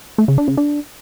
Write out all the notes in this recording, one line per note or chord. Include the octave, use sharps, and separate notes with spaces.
A3
C#3
D4
C#3
D4